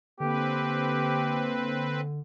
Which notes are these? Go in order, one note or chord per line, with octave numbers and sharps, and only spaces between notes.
D3 A#3 C4 G4 B4